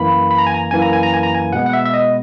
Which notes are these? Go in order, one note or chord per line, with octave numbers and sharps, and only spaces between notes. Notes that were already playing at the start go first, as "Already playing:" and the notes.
Already playing: F#2 E3 A#3 B5
B5
A#5
G#5
A#5
F#2 E3 A#3 G#5
A#5
G#5
A#5
G#5
A#5
G#5
B2 G#3 B3 F#5
F#5
E5
E5
D#5